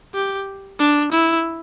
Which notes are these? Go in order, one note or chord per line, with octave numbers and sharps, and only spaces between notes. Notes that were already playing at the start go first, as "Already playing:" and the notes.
G4
D4
E4